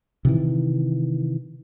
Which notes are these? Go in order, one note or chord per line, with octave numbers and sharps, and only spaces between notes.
C3 D#3 E3